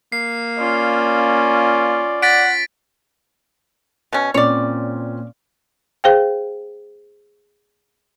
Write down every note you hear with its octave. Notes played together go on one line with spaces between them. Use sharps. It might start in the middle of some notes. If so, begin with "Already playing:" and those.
A#3 C7
C#4 F4 D5
F#5 A6 B6 D7
B2 C#4
A#2 C4 C#4 C#5 D5
G#4 C5 F5 G5